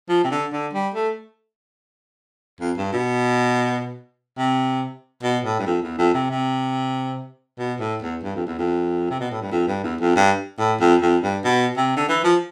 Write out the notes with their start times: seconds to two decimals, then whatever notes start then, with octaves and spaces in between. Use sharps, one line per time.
0.09 F3
0.24 C3
0.31 D3
0.53 D3
0.74 G3
0.94 A3
2.61 F2
2.77 G2
2.93 B2
4.38 C3
5.23 B2
5.45 A2
5.59 G2
5.67 F2
5.83 E2
5.98 F2
6.14 C3
6.30 C3
7.59 B2
7.80 A2
8.02 E2
8.23 G2
8.35 F2
8.47 E2
8.59 F2
9.10 C3
9.20 B2
9.31 A2
9.41 G2
9.51 F2
9.67 G2
9.84 E2
10.00 F2
10.16 G2
10.58 A2
10.80 F2
11.02 F2
11.23 G2
11.44 B2
11.77 C3
11.97 D3
12.09 E3
12.24 F3